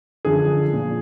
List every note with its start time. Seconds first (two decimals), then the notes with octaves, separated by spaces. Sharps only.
0.25 F#2 D3 F3 G#4
0.73 A#2 F3